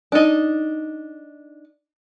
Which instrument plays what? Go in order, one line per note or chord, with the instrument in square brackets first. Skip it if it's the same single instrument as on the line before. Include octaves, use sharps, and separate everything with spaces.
[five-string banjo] D4 D#4